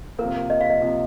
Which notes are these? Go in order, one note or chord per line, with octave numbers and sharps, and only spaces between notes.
C3 F3 A#3 A#4
D#5
F5
D#5
C3 F3 A#3